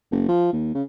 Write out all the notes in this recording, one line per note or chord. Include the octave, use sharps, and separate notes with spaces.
F#1
F3
D#2
C#3